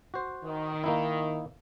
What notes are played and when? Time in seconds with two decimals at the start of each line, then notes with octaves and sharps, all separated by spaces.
0.14 F#4 C5
0.44 D#3
0.84 A#3 D#4 E4